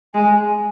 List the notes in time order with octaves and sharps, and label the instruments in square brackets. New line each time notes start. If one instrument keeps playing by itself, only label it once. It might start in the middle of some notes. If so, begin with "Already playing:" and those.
[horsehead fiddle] G#3 [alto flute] G#5